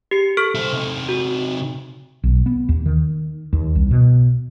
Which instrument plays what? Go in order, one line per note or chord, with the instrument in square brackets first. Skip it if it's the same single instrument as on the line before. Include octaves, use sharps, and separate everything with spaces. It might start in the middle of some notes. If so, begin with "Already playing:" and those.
[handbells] G4 C#7
A4 C#6 F6
[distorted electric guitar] E4 C5
C3 D#4
[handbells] F#4
[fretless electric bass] B1
B3
D#2
D#3
D#2
C2
B2